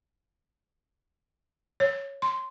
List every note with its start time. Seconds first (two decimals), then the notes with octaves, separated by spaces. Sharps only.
1.80 C#5
2.22 C6